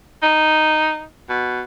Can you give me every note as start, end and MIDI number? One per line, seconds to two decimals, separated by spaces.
0.23 1.05 63
1.29 1.62 47